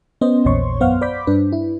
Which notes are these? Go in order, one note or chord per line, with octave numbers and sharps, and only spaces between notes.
B3 C#4 C5 D#5
A#1 E2 A#2 C#5 C6 C#6
F#2 B3 C5 F5 F#5 F6
C5 D5 B5 D6 G6 B6
G2 D4 B4
E4